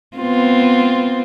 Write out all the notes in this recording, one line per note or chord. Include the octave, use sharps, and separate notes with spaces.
B3 C4 F4